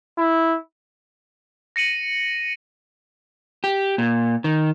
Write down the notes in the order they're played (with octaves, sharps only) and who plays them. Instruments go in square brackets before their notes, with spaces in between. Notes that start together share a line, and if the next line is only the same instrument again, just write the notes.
[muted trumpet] E4
[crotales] A#6 C#7 D#7 F#7
[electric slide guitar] G4
A#2
D#3